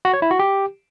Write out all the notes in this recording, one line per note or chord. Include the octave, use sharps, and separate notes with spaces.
F#4
C#5
E4
F#4
G4